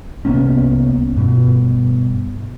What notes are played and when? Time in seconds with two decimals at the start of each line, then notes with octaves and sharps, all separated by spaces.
0.25 C2 A#3 B3 C#4
1.16 G2 B2